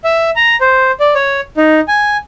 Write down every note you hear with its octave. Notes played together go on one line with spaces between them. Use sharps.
E5
A#5
C5
D5
C#5
D#4
G#5